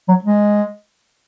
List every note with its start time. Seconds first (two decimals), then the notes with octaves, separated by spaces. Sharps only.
0.08 F#3
0.24 G#3